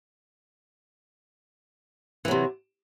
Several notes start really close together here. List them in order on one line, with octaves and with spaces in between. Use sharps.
E3 F#3 C3